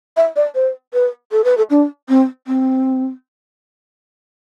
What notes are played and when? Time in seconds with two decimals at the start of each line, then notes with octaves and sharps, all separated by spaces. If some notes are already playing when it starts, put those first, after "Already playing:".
0.17 E5
0.36 D5
0.55 C5
0.93 B4
1.32 A4
1.44 B4
1.57 A4
1.70 D4
2.09 C4
2.47 C4